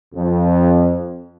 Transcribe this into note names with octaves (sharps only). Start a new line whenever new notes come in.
F2